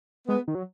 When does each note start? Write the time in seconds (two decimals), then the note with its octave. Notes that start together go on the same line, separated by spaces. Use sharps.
0.28 G#3 B3
0.48 D#3
0.55 F#3